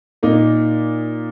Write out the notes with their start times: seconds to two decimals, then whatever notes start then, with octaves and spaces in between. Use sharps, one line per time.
0.23 A#2 A#3 D#4